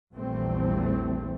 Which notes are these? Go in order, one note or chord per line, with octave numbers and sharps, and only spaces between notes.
A#1 E2 E3 G3 A3 C4